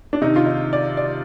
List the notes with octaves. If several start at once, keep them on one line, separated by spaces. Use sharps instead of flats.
D4
C3 D#3 D#4
F4
D#4
D5
D5